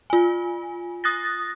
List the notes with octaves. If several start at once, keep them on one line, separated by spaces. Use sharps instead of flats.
F4 G#5
D#6 F#6 A6 A#6